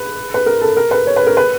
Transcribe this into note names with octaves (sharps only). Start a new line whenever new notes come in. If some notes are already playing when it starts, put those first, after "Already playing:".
Already playing: B4
B4
A#4
A4
A#4
B4
C#5
B4
A#4
B4